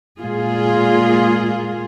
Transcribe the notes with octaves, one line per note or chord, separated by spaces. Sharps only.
A#2 G#3 F4 G#4